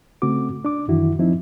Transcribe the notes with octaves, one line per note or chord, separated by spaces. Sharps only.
C#3 A3 C4 F#4 D6
D4 D6
F#2 D#3 E3 E4 F#4
F3 C4 D#4 E4